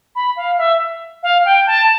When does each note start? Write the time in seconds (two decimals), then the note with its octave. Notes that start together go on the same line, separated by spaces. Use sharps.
0.16 B5
0.37 F5
0.58 E5
1.23 F5
1.45 G5
1.67 A5